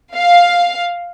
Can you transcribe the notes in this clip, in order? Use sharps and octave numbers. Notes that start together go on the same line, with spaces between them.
F5